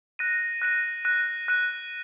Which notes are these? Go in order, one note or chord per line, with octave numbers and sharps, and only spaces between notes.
F#6 A#6 D#7
F#6 A#6 D#7
F#6 A#6 D#7
F#6 A#6 D#7